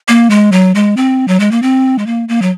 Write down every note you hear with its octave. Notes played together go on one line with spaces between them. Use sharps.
A#3
G#3
F#3
G#3
C4
F#3
G#3
A#3
C4
G#3
A#3
A#3
F#3